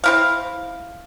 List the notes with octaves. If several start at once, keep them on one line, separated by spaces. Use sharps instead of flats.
C4 E4 F5